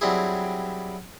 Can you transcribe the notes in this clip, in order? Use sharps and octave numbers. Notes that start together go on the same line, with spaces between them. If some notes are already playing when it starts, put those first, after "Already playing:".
F#3 G3 C4 D4 E4 G#4